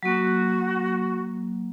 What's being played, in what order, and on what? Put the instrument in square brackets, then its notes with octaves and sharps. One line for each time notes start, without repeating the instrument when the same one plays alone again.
[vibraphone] F#3 A#3 [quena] F#4